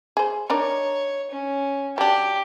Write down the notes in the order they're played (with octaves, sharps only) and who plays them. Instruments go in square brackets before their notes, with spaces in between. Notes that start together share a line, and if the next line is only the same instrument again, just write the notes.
[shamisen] G#4 C5
[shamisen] D4 D#4 A#4 [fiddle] C#5
[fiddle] C#4
[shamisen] F#3 D4 [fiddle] G4